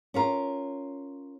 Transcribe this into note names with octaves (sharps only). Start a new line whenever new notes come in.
C#4 F4 A#4